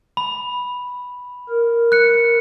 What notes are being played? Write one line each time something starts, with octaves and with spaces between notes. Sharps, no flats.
B5
A#4
F#6 C#7